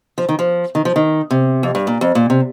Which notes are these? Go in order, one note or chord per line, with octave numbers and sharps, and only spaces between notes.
F3
D#3
F3
D#3
F3
D#3
C3
F2
G2
A#2
F2
A#2
C3